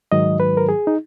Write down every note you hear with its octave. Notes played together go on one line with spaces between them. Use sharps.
G#2 D#3 F#3 D#5
B4
A#4
G#4
D#4